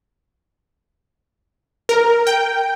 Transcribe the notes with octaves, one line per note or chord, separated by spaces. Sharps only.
A#4
G5